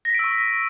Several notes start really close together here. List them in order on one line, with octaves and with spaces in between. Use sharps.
A#6 B6 D7 E6 C#6